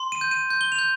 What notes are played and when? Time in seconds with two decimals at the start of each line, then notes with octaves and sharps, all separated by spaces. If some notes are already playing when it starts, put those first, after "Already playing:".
Already playing: C6
0.12 D#7
0.21 G6
0.31 D#7
0.50 G6
0.61 G7
0.72 F7
0.79 G6